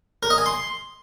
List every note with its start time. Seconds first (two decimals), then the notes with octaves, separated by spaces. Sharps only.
0.23 A#4
0.30 D#5
0.38 G#5
0.46 C6